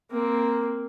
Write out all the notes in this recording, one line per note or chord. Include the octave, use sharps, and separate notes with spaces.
A#3 C4